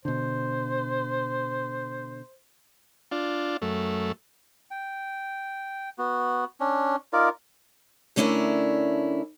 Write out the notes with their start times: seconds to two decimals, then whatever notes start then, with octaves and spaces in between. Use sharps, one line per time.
0.05 B2 D3 C5
3.11 D4 F4
3.62 F#2 A3
4.71 G5
5.98 B3 F#4
6.60 C#4 D4
7.13 D#4 F4 A#4 D5
8.16 D3 A3 C#4 D4 E4 A#4